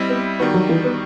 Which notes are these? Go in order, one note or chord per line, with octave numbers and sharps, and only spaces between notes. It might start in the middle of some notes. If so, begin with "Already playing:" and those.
Already playing: G3 C4 E4 G4 D#5
B3
D#3 G3 B3 D#4 F#4
F#3
E3
B3